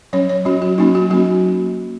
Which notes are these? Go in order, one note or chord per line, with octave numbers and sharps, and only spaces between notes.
F#3 C#4 C#5
C#5
F#3 C#4 F#4
F#4
F#3 A#3 C#4 D#4
F#4
F#3 A#3 C#4 F#4